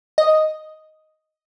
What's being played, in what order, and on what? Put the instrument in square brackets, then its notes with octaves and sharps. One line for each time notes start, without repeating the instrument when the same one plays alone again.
[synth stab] D#5